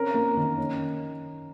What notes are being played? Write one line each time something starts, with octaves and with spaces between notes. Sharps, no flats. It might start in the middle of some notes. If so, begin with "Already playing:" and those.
Already playing: C4 C#4 A#4
A#3
D#3
C#4